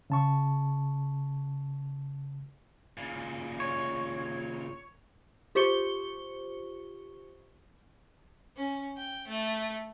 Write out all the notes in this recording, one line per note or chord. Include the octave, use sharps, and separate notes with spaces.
C#3 A5 C#6
A#2 C#3
C#5
F4 G4 C5 C#6 C#7 G7
C#4
G5
A3